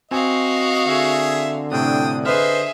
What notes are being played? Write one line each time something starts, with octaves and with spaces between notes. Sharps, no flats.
C4 F#4 D#5 F5 G#5
D3 G#4 E5
A2 C3 D4 G5 D#6
G#4 B4 C5 D#5 E5 F6